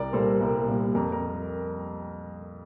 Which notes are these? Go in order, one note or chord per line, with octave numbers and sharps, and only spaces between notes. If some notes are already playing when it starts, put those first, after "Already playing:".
Already playing: C2 A#4 D5
A#2 G3 A#3 A4 C5
C2
A#2 G3 A#3
F2 A#4
A#4